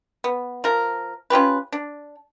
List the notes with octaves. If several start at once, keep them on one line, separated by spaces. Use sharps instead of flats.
B3
F3 A#4
C#4 F4 G4 B4
D4